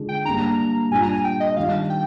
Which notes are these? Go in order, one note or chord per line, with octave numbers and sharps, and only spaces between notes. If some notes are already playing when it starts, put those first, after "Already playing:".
Already playing: D3 G#3 D4 F4
G5
G3 A#3 D4 A#5
A#2 G3 D4 F4 G#5
A#5
G#5
G5
D#5
D#3 G3 D4 F4 F5
G5